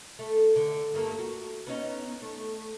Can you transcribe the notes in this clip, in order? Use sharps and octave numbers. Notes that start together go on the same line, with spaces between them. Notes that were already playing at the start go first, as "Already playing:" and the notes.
A3
D3
G2 A3 A#3
F#4
B3 C#4 D#4
A3